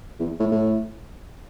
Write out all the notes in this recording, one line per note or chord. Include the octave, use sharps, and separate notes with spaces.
E2
A2
A2